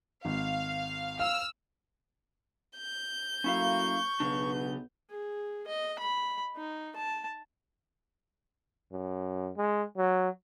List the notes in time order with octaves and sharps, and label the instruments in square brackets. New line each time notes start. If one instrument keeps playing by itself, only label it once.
[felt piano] G#1 [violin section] F5
[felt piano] F5 [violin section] E6 F6
[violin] G6
[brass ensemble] F#3 A3 A#3 [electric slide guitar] C#4 E4 F5 [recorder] C#6
[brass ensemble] B1 B3 [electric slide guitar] C#3 F#3 D4
[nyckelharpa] G#4
D#5
B5
D#4
A5
[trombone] F#2
G#3
F#3